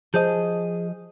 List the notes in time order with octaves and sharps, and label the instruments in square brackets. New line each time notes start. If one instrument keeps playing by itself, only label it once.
[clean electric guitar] F3 D#5 [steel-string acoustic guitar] G#4 [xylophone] C5 A5 G6